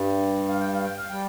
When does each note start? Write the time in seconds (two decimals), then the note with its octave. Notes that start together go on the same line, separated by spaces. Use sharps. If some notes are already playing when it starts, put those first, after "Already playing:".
Already playing: G2 G3
0.48 F5
0.61 G5
0.73 F5
0.85 G5
0.97 F5
1.10 G3 G5